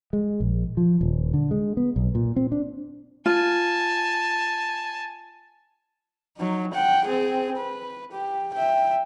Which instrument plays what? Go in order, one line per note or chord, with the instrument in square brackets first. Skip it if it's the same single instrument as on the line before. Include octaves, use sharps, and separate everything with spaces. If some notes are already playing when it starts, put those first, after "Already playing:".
[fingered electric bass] G#3
A#1
F3
D#1
D3
G#3
B3
B1
A#2
C4
D4
[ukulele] F4 [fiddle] G#5 A5
[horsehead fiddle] F#3 D#4
F#5 G5
C4 G#4
B4
G4
E5 G5